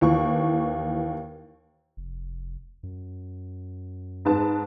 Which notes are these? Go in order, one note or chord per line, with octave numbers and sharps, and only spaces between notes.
D#2 E3 C#6
F1
F#2
G#2 B4 A5